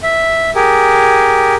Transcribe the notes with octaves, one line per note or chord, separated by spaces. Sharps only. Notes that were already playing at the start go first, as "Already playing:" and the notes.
E5
G4 G#4 A#4